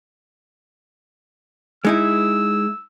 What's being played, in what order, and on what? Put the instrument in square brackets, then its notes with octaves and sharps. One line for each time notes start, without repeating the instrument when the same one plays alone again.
[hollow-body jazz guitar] G#3 D#4 E4 [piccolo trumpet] E6